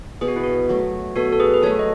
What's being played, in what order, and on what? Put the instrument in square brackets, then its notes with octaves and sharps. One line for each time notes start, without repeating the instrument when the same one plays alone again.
[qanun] B2 [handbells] G#4
[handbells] F#4
E4
F#4
[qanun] F#3 A3
[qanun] B2 [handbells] F#4 A4
[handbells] A4
G#4 B4
B4
[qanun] F#3 A3 [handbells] A4 C#5
[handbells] D#5